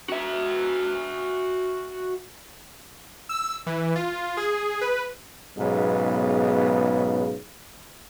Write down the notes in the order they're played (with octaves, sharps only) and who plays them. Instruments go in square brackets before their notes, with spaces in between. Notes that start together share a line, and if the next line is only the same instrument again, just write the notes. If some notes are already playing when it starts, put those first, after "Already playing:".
[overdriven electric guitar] F#4 E5
[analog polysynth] E6
E3
F4
G#4
B4
[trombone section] B1 G#2 C#3 B3